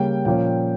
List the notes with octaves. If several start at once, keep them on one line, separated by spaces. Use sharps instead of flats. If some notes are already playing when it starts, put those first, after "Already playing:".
Already playing: C#3 G3 A#3 C#4 G5
A#2 F3 A#3 C#4 G5